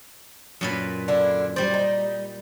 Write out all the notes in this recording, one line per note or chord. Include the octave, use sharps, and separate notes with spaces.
F#2 A#2 B4
D3 D4 E4
G3 C5 D5
D#4